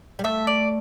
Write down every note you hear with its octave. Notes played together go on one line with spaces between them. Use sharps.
G3
A3 E5
D5